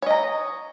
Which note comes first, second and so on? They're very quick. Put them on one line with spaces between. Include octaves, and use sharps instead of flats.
C#5 D#5 A#5